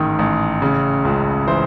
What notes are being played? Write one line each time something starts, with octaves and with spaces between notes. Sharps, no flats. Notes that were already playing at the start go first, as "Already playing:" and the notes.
Already playing: A1 G#2 D#3
A1
C#3
C#2
E3 C5